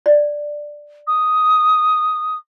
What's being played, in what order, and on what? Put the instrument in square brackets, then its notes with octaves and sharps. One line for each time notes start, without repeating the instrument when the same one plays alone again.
[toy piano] D5
[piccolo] D#6